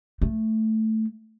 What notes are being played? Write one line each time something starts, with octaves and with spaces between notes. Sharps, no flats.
A3